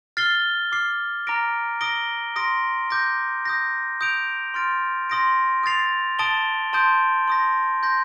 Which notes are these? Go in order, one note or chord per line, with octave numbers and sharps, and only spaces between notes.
F6 A6 C7 G7
D6 F6 C7
A#5 D6 F6 A#6 D7
D#6 A#6 D7 G7
C6 D#6 A#6 D7
D6 G6 A#6
D#6 G6 A#6
D#6 G6 D7 F7
C6 F6 A6 D7
C6 D#6 A#6 D7
D#6 A6 C7 F7
A5 D#6 A6 D7 G7
A5 C6 D#6 G6 D7
C6 D#6 A#6
C6 G6 A#6